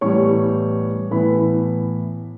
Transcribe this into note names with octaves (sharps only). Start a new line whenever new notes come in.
A2 E3 G3 B3 C#5 C#6
A2 E3 B3 B4 B5